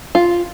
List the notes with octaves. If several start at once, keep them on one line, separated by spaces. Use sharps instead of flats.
F4